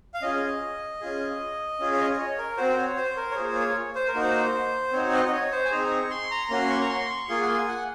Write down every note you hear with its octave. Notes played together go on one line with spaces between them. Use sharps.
F5
C#4 F4 G#4 D#5
C#4 F4 G#4
C#4 F4 G#4
C#5
D#5
D#5
C#5
A#4
C4 F#4 C5
C#5
C5
A#4
C#5
A#3 F4 G#4 C5
C#5
C5
A#4
A#3 D#4 F#4
C5
C4 D#4 F#4 C#5
D#5
D#5
C#5
C5
G#5
C4 D#4 G#4 A#5
C#6
C6
A#5
A#3 C#4 F#4 C6
C#6
A#5
C6
C#6
A#3 F4 G#4 C6
F#5
G#5
F#5